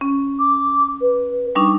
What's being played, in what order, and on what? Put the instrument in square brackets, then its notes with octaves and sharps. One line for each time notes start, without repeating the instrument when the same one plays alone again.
[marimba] C#4
[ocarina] D6
B4
[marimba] G3 D4 D#4 [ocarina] C#6